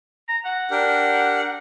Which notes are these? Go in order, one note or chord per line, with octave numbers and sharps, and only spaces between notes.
A#5
F#5
D4 G4 A#4